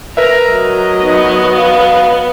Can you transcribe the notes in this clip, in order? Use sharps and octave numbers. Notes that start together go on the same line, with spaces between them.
A#4 B4 E5 A#5
F#3 D#5
B3 D#4
F5